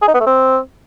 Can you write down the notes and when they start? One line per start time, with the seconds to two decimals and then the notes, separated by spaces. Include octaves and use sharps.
0.02 G#4
0.08 D#4
0.14 B3
0.20 A3
0.27 C4